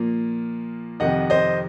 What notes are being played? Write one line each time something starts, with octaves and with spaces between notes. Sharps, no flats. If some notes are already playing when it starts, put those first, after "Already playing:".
Already playing: A#2 F3 A#3
F2 C3 D#3 D#5 F#5
C5 D#5